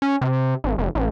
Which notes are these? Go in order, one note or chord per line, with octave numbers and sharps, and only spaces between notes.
C#4
C3
G#1
F1
A1